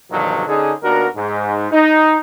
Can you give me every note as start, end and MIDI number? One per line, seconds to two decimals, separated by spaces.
0.10 0.46 43
0.10 0.46 47
0.10 0.46 50
0.10 0.46 51
0.10 0.46 53
0.10 0.46 54
0.47 0.72 50
0.47 0.72 61
0.47 0.72 63
0.47 0.72 68
0.82 1.06 39
0.82 1.06 59
0.82 1.06 62
0.82 1.06 66
0.82 1.06 70
1.16 1.70 44
1.71 2.19 63